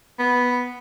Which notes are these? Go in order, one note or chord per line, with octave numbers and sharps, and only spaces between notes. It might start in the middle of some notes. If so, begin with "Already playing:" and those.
B3